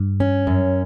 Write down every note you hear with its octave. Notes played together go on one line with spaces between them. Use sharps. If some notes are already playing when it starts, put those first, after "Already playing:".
Already playing: G2
C#4
F#2